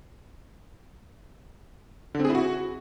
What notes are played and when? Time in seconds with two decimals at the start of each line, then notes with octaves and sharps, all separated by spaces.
2.15 D3
2.20 C4
2.25 G#4
2.30 E4
2.35 F#4